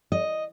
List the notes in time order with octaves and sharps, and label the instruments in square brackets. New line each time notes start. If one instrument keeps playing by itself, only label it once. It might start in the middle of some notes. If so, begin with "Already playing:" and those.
[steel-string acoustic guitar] D#5